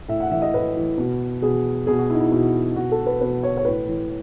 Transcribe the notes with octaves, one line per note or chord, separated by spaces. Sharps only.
A2 E5
F#5
E3 E5
D#5
A2 B4
E3
B2
B2 G#4
B2 G#4
F#4
E4
D#4
E4
B2
B2 F#4
A4
B4
B2 B4
C#5
C#5
A2 B4
E3